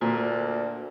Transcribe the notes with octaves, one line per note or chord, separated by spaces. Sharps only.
D2 A#2